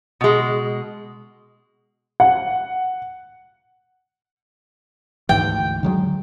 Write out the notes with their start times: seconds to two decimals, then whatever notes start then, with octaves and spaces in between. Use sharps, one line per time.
0.21 B2 G#3
2.20 F#5
5.29 D2 G#2 E3 G5
5.83 D3 F#3 G#3